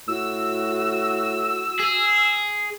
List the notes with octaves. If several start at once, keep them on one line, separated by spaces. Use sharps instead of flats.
A2 F#4 E6
G#4